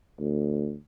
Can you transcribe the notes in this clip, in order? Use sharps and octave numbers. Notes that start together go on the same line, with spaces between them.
D2